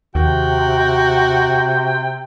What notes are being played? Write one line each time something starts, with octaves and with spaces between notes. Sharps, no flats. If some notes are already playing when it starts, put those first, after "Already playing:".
D#2 C3 F#4 G5